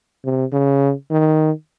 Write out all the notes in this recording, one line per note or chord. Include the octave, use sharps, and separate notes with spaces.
C3
C#3
D#3